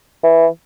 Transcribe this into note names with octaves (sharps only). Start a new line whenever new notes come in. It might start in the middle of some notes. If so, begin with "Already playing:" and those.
E3